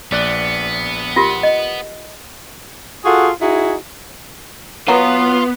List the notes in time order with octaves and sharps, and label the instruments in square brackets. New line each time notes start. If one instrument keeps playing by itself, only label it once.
[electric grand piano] A#1 D5 F#6 [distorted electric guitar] B3
[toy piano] F4 G4 A#4
D#5
[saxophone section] F4 F#4 G#4 A4 F#5
D#4 E4 F#4 G#4
[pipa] F#3 [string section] B3 [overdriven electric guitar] F4